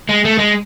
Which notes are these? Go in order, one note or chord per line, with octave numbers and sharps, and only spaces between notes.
G#3
A3
G#3